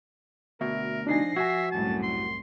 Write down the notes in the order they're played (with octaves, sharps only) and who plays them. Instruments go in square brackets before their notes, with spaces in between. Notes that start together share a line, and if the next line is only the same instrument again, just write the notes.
[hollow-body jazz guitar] D2 B2 [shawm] A#4 [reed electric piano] E5
[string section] F3 A#6 C7 [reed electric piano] D4 D#4 G#5
[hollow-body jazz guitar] F#4 [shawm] E5 [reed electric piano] G#5 G#6
[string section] C2 F#2 A2 [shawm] A5
[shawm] C6